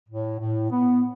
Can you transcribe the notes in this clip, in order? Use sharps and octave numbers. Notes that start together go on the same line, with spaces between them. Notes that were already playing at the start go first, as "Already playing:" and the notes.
A2
A2
B3